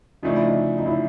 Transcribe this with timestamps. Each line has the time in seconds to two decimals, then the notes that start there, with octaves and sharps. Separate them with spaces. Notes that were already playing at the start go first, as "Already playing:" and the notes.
0.23 C#3 F3 A3 D4 D#4
0.35 E4
0.46 D#4
0.78 D#4
0.86 E4